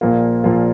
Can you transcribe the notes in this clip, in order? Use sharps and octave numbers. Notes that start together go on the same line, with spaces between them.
A#1 A#2 F3 A#3 F4
A#1 A#2 F3 A#3 F4